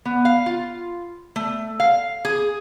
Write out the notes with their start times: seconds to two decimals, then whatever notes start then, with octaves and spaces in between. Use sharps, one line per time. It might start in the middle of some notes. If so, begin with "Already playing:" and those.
0.05 B3
0.25 F5
0.46 F4
1.36 A3
1.80 F5
2.25 G#4